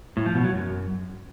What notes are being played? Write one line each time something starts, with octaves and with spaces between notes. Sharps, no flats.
A2
F3
B2
F#3
F#2